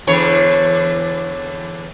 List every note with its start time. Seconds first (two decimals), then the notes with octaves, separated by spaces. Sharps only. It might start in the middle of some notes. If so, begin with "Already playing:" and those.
0.07 E2 D3 C#5